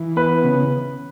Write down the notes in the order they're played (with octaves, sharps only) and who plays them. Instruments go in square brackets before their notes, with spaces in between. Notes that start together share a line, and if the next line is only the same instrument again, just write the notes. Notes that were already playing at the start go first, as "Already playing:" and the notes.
Already playing: [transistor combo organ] E3
[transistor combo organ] B3 [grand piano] B4
[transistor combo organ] C#3